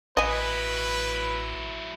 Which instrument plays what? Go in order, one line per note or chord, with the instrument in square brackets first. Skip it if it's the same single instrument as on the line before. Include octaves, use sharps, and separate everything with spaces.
[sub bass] A1 [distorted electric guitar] F#3 E4 [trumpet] B4 [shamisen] D#5 G#5